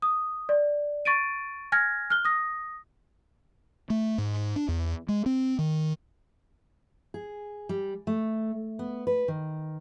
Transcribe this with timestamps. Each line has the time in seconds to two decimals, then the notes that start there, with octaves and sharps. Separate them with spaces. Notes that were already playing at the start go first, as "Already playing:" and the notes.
0.02 D#6
0.49 D5
1.05 C#6 A6 D7 D#7
1.72 G#5 F6 G#6 A#6
2.10 F6 F#6 G7
2.25 D#6 A#6
3.90 A3
4.18 G#2
4.56 D4
4.68 E2
5.09 G#3
5.26 C4
5.59 D#3
7.14 G#4
7.69 G3
8.07 A3
8.79 B3
9.07 B4
9.28 D#3